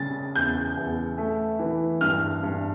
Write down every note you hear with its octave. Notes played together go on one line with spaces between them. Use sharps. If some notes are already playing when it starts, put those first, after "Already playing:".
Already playing: C#3 G3 A6
E2 G6
E2
A3
E3
G2 F6
G2